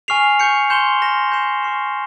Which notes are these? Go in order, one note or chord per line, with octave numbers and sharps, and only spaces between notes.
G#5 C#6 F6 C7 F7
C#6 G6 C#7
C6 G6 C#7 E7 G7
C6 F6 A#6 E7 G7
G6 C7 E7 G7
C#6 F6 C7 E7